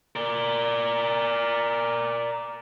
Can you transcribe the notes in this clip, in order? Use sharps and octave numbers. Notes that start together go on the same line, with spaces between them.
A#4 D5